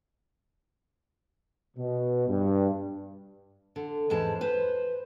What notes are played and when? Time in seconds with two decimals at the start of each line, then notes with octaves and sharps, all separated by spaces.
1.77 B2
2.28 G2
3.76 D3
4.10 E2 G#2 G#3 A5
4.41 B4 C5